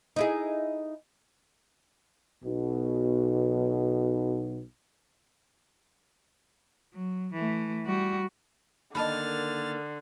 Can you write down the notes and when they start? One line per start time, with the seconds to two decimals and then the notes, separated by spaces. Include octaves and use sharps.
0.16 D#4 E4 G#4
2.43 B1 B2
6.94 F#3
7.34 E3 A3
7.86 G3 F#4
8.95 D3 D#3 A#3 D#5 A5 B5 F6 A6